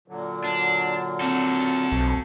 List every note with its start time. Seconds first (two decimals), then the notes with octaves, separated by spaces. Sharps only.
0.08 A#2 D3 F#3
0.44 D4
1.21 C4 F#4 A4
1.92 B1 F3